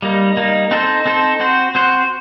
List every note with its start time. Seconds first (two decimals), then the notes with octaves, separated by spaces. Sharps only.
0.02 G3 A#3 D#4
0.37 G3 A#3 D#4
0.71 C4 D#4 A4 C5
1.06 C4 D#4 A4 C5
1.40 C4 F#4 C5
1.75 C4 F#4 C5